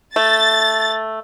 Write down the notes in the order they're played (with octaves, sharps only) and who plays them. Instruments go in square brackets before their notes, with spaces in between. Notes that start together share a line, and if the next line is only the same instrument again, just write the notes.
[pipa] A3 [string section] A6